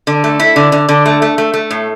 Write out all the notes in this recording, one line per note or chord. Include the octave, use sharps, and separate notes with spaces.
D3
A3
E4
D3
D3
D3
A3
A3
A3
A3
A2